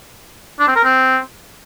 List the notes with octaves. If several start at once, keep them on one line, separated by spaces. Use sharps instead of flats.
D4
C4
A#4
C4